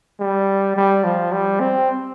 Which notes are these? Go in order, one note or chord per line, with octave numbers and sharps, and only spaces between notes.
G3
G3
F3
G3
C4